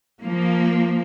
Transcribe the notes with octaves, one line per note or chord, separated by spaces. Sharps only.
F3 A#3